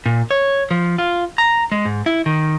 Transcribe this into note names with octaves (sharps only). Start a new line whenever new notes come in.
A#2
C#5
F3
F4
A#5
G#3
G#2
E4
D#3